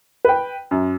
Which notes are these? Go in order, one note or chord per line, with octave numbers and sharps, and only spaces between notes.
B4 G5
F#2